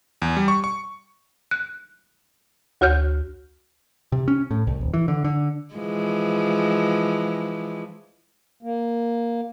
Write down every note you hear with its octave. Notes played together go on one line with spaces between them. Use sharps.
E2
G3
C#6
C#6
F#6
D2 F#4 C#5 F6 G6
C3
C#4
A2
C2
D#1
E3
D3
D3
E3 F3 G#3
A#3